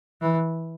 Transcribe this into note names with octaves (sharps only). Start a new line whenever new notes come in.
E3